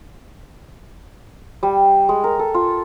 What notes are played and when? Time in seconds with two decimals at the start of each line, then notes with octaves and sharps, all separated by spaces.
1.63 G3
2.09 G#3
2.24 A#4
2.39 A4
2.54 F4